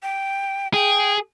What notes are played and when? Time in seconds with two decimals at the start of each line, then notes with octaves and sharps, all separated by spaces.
0.03 G5
0.74 G#4 G5